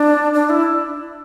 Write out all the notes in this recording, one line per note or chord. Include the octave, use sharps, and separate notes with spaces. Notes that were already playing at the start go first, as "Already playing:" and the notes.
Already playing: D4
D4
E4